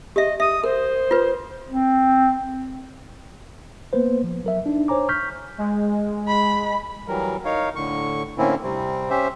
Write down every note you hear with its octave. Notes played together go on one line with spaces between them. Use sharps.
G4 D#5 E5
E5 D#6
A#4 C5
F4 B4
C4
A#3 B3 B4 C5
F3
F#3 A#4 E5
D4 D#4
C5 C#5 G#5 A#5 D6
C#6 F6 G6 B6
G#3
B5
E3 F#3 G3 A#4
D#4 A#4 C#5 F5
A2 D3 C#6
A2 D3 A#3 C4 C#4 E4
C3 G3 C4
C#4 G4 C5 E5